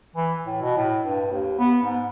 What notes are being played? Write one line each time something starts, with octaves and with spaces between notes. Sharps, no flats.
E3
A2
B2
A2
G2
D#2
B3
G#2